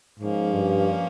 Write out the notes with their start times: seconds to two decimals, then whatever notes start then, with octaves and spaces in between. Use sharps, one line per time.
0.19 G#2 F3 A#3 C#4
0.53 G2